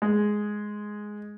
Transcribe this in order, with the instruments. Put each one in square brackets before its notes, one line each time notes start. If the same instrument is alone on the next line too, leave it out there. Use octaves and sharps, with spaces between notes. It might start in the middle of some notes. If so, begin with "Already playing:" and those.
[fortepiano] G#3